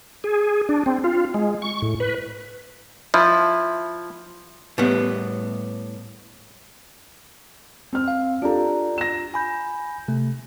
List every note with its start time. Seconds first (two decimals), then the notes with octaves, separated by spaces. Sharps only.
0.24 G#4
0.69 D4
0.86 C4
1.04 F4
1.34 G#3
1.62 C#6
1.82 A2
2.00 B4
3.14 F3 E4
4.78 A2 G3 B3
7.93 C4 F6
8.08 F5
8.42 D4 F4 G4 A4 A#5
8.98 A#6 E7
9.34 G#5 B5 G6
10.08 C3 A3